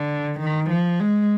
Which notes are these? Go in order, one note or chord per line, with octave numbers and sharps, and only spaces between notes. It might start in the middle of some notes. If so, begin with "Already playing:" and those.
Already playing: D3
D#3
F3
G#3